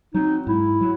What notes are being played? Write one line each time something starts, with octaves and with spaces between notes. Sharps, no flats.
F#3 C4 D#4
G#2 E4
F#3